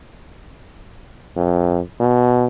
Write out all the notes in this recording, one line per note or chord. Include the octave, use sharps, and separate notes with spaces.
F2
B2